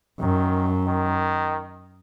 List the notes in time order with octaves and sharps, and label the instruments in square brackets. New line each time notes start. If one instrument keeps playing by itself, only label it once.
[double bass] F#2 [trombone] D#3
[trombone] D#3